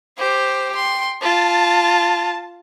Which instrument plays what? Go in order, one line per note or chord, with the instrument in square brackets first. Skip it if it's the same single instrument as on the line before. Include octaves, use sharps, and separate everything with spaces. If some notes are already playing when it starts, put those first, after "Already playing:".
[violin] G4 C5
[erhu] G5 [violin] C6
[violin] F4 [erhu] A5